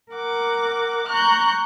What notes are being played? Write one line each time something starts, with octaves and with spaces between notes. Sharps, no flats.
A#4 F#5 D6
A#5 C#6 F#6 G6